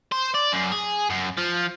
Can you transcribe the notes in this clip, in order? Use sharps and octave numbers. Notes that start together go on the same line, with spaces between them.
C5
D5
F#2
G#4
F#2
F3